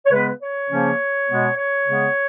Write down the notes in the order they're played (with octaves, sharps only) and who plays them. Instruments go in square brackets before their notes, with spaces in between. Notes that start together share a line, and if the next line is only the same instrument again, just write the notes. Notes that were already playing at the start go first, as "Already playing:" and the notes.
[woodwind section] C#5
C#3 G#3 B3 B4
C#5
C#3 F3 A#3 C#4
B2 G#3 B3
C#5
C#3 G#3 B3